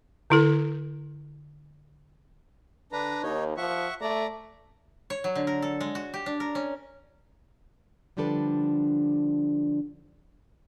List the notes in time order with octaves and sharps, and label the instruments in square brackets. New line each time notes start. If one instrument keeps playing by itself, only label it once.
[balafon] D3 E4 A4
[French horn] D3 [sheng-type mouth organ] D4 B4 A#5
[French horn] D#2 [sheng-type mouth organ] D#4 C#5
[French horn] F3 [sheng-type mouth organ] E5 F#5 C#6
[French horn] A3 [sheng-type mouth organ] D5 A#5
[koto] C#5
F#3
D3
A#4
A4
G#3
F#4
G4
D4
A#4
C#4
[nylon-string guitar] D3 F3 G3 D4 A4 B4